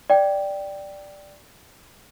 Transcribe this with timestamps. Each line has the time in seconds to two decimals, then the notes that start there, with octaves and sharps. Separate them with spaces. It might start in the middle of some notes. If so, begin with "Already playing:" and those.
0.10 D5 G5